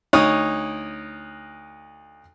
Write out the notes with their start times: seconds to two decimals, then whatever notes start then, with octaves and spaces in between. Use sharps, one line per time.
0.13 D2 D#4 C#5 D#6